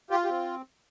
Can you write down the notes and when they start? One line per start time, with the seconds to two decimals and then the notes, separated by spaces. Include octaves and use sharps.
0.10 F4 G4
0.25 G4
0.29 C4